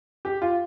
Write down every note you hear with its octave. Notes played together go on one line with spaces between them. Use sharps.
G4
F4